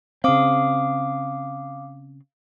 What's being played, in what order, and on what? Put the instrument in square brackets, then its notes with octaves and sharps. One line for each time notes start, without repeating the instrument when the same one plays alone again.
[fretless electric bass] C#3 C4 [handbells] F5 D6 D#6